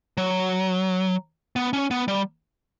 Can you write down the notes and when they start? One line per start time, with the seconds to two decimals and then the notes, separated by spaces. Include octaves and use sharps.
0.18 F#3
1.56 B3
1.73 C#4
1.91 B3
2.08 G3